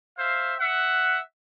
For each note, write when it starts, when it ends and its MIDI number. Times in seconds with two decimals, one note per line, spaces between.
0.18 0.54 72
0.18 0.54 76
0.18 0.54 77
0.60 1.20 76
0.60 1.20 78